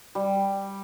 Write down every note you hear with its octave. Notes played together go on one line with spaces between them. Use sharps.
G3